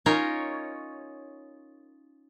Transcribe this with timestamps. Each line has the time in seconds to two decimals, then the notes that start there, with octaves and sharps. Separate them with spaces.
0.06 C#4 D#4 F4 A#4 C#5